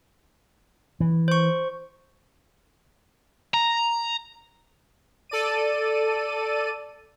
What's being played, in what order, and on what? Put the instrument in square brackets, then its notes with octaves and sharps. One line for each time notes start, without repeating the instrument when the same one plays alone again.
[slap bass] E3
[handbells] C5 C#6
[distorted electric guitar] A#5
[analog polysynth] A4 D5 D#7